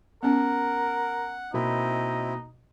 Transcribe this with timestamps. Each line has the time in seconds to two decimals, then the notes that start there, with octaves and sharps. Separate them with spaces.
0.23 B3 C#4 A#4 F#5
1.54 B2 A#3 C4 D#4 E4 B5